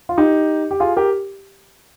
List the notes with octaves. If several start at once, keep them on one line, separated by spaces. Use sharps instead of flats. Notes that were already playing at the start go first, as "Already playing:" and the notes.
F4
D#4 G4
G4
F4 G#4
G4 A#4